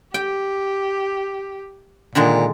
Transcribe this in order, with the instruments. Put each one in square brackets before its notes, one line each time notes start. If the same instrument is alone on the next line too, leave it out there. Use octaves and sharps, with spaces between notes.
[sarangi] G4 [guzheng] G5
[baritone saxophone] A#2 [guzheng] D3 D#3 G#3